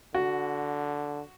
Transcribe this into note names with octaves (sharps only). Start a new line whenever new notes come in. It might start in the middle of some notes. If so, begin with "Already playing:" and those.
D3 F#4